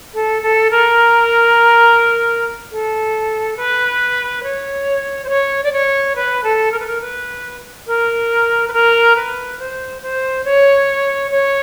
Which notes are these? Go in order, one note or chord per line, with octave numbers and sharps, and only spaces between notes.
A4
A4
A#4
A4
B4
C#5
C5
C#5
D5
C#5
B4
A4
A#4
B4
A#4
B4
A#4
B4
A#4
B4
C5
C5
C#5
C#5